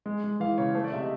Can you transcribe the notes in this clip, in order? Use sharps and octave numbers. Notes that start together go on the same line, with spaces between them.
G#3
G#3
E3 F5
C#3 C#5
A3 C5
D5
C3 E5
D#5